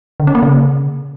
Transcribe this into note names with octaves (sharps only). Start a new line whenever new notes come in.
D3
C#4
A#3
C#3